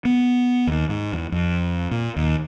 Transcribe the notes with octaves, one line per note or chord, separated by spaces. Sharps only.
B3
D#2
G#2
E2
F2
A#2
D#2